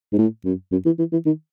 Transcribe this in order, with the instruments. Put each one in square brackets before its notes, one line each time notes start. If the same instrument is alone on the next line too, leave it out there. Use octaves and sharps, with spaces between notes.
[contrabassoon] G#2
A2
F#2
F#2
E3
E3
E3
D#3